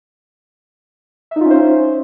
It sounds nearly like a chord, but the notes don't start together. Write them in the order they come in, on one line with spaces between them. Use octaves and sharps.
E5 D#4 F4 C#4 C5